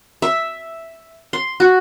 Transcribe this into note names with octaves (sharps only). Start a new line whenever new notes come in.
E5
C6
F#4